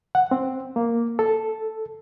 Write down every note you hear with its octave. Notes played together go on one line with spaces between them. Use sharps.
F#5
C4
A#3
A4